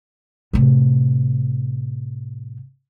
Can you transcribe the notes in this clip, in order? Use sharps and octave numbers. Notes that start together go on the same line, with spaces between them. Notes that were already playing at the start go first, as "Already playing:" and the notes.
A2 C3